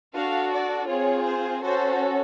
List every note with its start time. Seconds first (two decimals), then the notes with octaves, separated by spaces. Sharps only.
0.14 D4 F#4 A4 F5
0.52 D5
0.88 C4 F4 G#4 C#5
1.25 C5
1.62 C#4 F#4 A4 C5